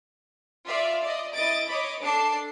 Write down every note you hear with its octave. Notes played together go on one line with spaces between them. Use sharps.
F4 D5 E5 F5
D5 D#5
E4 D#5 D#6 A6 D7
C#5 D#5 B5 D6
D4 A4 A5 D6 C7